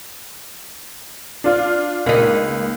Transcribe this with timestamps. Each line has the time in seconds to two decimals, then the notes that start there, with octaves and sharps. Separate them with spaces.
1.44 D4 F4
2.06 C#2 A#3 D#4